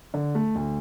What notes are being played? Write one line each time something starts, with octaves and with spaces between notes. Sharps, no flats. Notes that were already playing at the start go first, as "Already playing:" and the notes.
D3
A3
D2